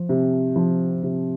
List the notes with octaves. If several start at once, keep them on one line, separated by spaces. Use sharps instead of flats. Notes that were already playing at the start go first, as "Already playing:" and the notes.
Already playing: F3
C3
F3
C3